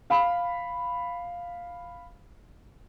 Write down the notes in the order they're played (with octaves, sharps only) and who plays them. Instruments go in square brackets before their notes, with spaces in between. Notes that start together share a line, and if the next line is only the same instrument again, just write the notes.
[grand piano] F5 B5